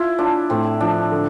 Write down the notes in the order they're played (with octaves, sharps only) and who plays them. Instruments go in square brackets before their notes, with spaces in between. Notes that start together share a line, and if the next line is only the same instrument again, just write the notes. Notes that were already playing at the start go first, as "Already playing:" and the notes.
Already playing: [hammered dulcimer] E4 [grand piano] F4
[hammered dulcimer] D4 [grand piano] F4
[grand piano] A2 [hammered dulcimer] C4
[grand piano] F3 [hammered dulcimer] D4
[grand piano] D3